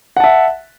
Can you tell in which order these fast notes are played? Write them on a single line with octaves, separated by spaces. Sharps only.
F#5 A5 E5